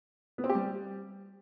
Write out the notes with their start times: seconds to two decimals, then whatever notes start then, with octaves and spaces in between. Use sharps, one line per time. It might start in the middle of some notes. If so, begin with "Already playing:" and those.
0.38 B3
0.44 C4
0.49 G4
0.55 G3